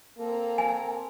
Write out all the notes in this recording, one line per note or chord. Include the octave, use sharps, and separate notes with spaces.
A#3 C4 A4 A#5
G#5